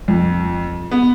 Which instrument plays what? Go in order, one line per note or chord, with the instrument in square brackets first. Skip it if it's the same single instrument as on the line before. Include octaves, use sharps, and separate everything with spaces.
[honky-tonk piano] F2
B3